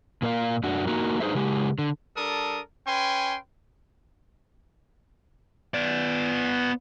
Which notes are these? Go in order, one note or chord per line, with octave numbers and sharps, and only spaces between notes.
A#2 A#3 A#4 D5 F5
F#2 D4 F#4
A#3 D#4 F#4 A#4
D4 D#4 G#4 B4 C5 E5
C#3 G#3 G4
D3
G3 D4 A4 A#4 D#6
C#4 B4 G5 G#5 C6
B3 D5